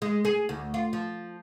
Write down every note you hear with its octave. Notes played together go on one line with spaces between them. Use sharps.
G#3
G#4
D2
F4
F3